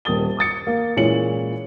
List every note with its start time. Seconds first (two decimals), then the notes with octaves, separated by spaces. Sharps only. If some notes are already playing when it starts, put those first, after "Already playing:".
0.05 D#1 A#4 D#6 A6 G7
0.37 D6 D#6 A6 C#7
0.67 A#3
0.97 A#2 E3 G#3 C#4 C#7 F#7